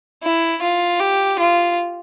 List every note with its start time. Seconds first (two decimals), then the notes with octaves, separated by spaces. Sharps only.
0.23 E4
0.62 F4
1.00 G4
1.40 F4